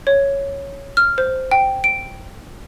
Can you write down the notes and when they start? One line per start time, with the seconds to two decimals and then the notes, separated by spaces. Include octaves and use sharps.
0.07 C#5
0.97 F6
1.18 C5
1.51 G5
1.84 D7